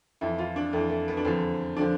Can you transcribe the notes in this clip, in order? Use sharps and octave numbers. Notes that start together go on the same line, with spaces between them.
F2 E3 E4
F4
D4
F2 E3 A3
A3
B3
D4
E2 D3 F3 C4
D3 F3 D4